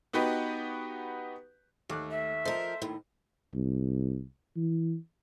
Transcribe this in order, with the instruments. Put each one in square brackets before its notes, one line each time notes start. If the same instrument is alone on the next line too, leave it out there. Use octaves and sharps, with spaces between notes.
[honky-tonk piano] B3 D#4 F#4 G4 B4
[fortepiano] D#2 D6 F#6 [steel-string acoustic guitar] A3
[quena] E5
[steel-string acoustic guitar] F3 A#4 [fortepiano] A4 C5 D#5
[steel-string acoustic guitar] D#2 A2
[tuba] C2
E3